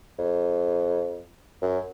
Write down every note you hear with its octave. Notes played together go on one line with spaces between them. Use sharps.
F2
F#2